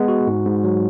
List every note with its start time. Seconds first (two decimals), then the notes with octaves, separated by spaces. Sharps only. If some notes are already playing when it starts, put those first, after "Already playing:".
Already playing: G#3 B3
0.08 F#4
0.27 G#2
0.46 G#2
0.64 F#3